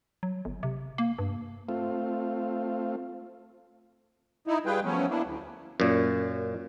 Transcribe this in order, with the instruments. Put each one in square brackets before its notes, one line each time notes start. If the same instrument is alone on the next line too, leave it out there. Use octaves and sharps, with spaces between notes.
[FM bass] F#3
G1
C3
A#3
G2
[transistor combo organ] A3 C4 F4
[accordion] D#4 E4
G3 F4 G#4 B4 G5
F3 F#3 A3 B3 C#4
A#3 B3 D4 E4
D2
[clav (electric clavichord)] F#2 A#2